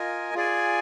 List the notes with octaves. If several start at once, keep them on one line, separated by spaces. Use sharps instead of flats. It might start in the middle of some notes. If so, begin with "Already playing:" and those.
Already playing: F4 A#4 D#5 G#5
F4 G#4 D5 G#5